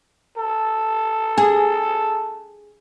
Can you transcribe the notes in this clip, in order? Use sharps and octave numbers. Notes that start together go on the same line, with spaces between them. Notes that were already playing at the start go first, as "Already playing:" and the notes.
A4
G#4